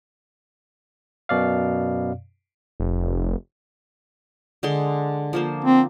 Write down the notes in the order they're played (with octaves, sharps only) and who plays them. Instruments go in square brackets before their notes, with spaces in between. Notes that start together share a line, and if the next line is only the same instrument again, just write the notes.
[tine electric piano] F#2 B2 D5 F5
[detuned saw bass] F1
[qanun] D3 G#3 C6
F3 A#3 C5
[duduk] C4